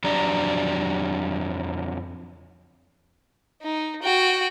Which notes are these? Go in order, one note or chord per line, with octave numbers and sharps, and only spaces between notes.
F2 F#3 D4 G4 D5 A#5
D#4
F#4 G5